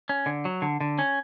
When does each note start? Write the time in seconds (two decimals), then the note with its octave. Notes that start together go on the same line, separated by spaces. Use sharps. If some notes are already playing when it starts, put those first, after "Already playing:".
0.09 C#4
0.26 D3
0.45 F#3
0.62 D3
0.81 D3
0.99 C#4